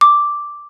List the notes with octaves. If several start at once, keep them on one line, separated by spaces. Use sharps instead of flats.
D6